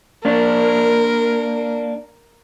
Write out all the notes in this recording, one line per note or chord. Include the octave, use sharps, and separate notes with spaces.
A#3 D4 A#4